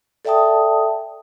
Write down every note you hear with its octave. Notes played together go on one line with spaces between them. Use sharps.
A4 D5 E5 G5 A5 D#6